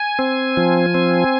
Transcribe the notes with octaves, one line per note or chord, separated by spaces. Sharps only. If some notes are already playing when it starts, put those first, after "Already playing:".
Already playing: G#5
C4
F3
C4